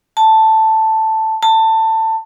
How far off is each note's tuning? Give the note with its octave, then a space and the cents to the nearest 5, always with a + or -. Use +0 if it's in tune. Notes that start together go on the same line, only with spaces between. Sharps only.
A5 +5
A5 +20